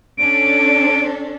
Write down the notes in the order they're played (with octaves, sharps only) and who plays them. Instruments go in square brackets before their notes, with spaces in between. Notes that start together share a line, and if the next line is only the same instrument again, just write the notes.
[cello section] C#4 D4 A4 [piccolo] D7